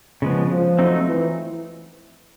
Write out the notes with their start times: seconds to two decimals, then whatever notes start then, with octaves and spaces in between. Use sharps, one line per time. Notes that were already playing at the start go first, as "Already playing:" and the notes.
0.22 C#3 F3 G#3 B3
0.51 F3
0.79 F#3 A3 C4 D#4
1.07 E3